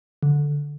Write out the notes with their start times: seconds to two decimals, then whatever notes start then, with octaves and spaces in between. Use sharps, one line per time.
0.23 D3